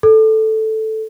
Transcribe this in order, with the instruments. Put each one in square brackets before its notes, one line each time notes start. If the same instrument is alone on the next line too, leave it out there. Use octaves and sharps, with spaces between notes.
[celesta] A4